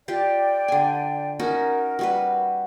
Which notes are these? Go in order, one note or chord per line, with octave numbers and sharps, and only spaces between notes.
F4 G4 D5 G5
D3 G#5
C#4 D#4 F#4 A#4
G3 F#4 B4